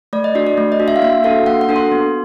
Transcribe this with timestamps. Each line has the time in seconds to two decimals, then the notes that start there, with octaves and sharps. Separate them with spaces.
0.13 A3 D5
0.24 D#5
0.35 D4 F#4 D5
0.47 D5
0.57 A3
0.72 D#5
0.80 D4 F#4
0.88 E5
0.96 F5
1.02 A#3 E5
1.24 D4 F#4 A4 F5
1.46 A#3 F#5
1.61 F#5
1.69 D4 F#4 A4
1.76 C6
1.92 B3